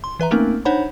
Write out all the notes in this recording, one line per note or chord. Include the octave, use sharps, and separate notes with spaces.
C6
E3 B4 E5 A#5
A3 A#3 C4 C#4 D#4 A#4
D4 D#4 C5 C#5 F#5 B5